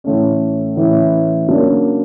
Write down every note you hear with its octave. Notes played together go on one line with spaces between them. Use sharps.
A2 E3 A3 C#4
A2 E3 A3 C#4
C#3 F#3 A#3 D4